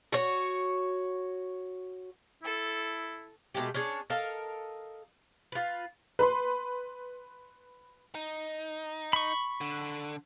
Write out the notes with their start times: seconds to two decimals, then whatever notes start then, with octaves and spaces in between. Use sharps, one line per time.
0.12 F#4 C#5
2.43 E4 A4
3.54 B2 G#3 A3 G4
3.74 C#4 D4 G#4 C#5
4.10 A4 A#4 D#5 F5
5.52 F4 B4
6.19 B4 B5 C6
8.15 D#4
9.13 B5 C#6
9.61 D3